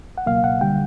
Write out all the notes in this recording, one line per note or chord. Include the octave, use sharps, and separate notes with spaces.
F#5
C#2 B2 F#3 A#3 F5
F#5
D3 G3 G5